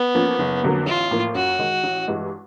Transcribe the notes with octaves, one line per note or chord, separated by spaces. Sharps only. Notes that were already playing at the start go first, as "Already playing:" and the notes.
Already playing: B3
F3 A#3 C#4
F#1
F2 D3 F#3 A#3
A1 F4
A2 F3 A#3
F#2 F#4
D#3 G#3
A1
G2 E3 G#3